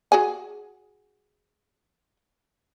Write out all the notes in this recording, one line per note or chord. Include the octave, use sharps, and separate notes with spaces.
F#4 G#4 G#5